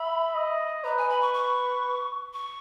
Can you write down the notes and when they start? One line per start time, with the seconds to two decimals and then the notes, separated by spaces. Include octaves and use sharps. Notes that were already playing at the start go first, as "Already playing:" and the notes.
Already playing: E5 B5
0.35 D#5
0.84 B4 A#5
0.98 G#5
1.10 B5
1.22 C#6
1.34 C#6
2.34 C#6